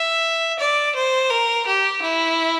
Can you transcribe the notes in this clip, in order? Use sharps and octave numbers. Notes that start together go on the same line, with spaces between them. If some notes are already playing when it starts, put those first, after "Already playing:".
Already playing: E5
D5
C5
A#4
G4
E4